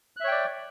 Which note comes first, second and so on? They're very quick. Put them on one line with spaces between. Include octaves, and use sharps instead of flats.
F#6 E5 C#5 G5 D5